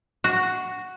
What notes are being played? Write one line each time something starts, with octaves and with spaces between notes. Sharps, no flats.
F#4